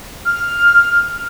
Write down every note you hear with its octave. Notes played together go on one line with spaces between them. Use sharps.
F6